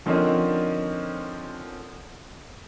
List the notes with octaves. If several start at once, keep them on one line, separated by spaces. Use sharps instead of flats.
D3 F3 A#3 C4 C#4 D#4